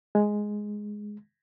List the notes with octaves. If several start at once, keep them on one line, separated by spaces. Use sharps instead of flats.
G#3